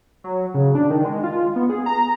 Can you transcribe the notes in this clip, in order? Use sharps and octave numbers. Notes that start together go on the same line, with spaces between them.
F#3
C#3
D4
D#3
G#3
F4
B3
G#4
A#5